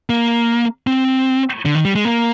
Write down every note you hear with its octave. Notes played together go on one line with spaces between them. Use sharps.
A#3
C4
D3
D#3
G3
G#3
A#3